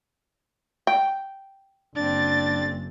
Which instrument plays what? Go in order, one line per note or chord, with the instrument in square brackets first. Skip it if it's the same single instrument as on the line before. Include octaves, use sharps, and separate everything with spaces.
[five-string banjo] G5
[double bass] F#1 [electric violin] C4 A6 [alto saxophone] D4